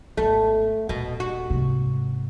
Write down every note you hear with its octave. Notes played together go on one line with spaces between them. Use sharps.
G#1 A3 B3
D#1 B2
F#4
G#2 C3